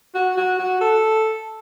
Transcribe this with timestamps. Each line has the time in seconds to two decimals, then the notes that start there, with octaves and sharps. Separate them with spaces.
0.15 F#4
0.37 F#4
0.59 F#4
0.81 A4